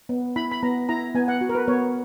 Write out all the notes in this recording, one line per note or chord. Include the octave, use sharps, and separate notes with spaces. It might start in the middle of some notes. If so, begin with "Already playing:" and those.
B3
E4 B5
B5
B3 A#5
E4 A#5
B3 G#5
F#5
F#4
A#4
B4
B3 C#5